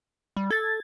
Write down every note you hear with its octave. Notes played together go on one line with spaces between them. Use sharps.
G3
A4 G#6 A6